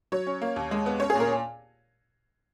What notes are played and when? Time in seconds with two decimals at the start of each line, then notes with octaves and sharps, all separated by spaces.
0.12 F#3 C#5
0.27 C#4
0.42 A#3
0.56 D#2
0.71 G#3
0.86 B3
1.00 C#4 C#5
1.10 G#4
1.15 A#2 A#4